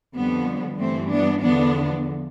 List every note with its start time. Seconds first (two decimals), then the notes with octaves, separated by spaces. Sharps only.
0.15 F2 D3 F3 G3 B3
0.79 G2 E3 A3 C4
1.12 B3 D4
1.43 E2 D3 F3 B3 D4